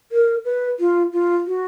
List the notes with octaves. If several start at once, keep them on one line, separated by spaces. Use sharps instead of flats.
A#4
B4
F4
F4
F#4